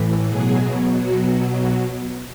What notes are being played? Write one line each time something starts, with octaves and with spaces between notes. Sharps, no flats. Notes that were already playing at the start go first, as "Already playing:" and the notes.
Already playing: A2 E3
B2 F#3 G#4
B2 F#3 F#4